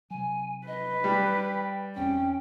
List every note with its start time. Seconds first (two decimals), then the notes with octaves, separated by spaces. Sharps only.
0.10 C3 F#3 G#5
0.67 B4 D#5
1.04 G3 G5
1.96 E1 E2 C4 C#4 G5